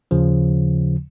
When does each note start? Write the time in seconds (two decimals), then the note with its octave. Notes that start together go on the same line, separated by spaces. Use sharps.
0.11 D#2 C#3 F3